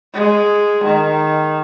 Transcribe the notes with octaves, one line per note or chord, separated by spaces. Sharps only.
G#3
D#3